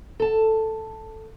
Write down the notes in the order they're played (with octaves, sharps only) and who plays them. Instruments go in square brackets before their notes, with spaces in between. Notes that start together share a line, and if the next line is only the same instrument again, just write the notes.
[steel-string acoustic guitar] A4 A5